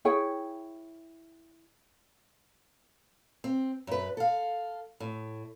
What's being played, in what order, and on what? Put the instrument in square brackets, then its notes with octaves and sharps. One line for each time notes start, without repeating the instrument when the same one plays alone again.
[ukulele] E4 G#4 C#5 G5
[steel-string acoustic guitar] C4
F#2 B4
A4 F5
A2